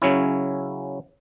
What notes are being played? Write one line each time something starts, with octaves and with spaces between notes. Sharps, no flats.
C#3 F#3 C#4 E4